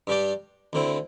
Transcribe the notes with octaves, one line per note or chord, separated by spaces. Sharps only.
G2 G3 D4 G4 D5
D2 D3 C4 E4